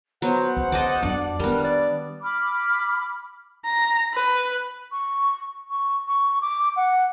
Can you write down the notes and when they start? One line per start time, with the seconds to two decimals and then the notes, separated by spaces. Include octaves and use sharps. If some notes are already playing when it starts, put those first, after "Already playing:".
0.22 F#3 B3 C5 F#5
0.57 C#2 C5
0.72 C#3 C5 D#5 A5 D6
1.03 F2 G3 D4 D5
1.40 D#3 G3 G#3 B3 A#4
1.64 D5
2.22 B5 D6 F6
3.66 A#5
4.14 B4
4.92 C#6
5.71 C#6
6.08 C#6
6.42 D6
6.76 F#5